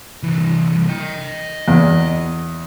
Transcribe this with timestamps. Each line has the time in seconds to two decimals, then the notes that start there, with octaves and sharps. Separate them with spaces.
0.23 C2 E3
0.89 D#5 G5
1.68 E2